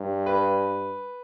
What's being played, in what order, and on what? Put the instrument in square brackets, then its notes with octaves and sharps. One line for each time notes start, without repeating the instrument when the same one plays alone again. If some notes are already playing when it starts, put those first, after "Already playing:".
Already playing: [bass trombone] G2
[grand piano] B4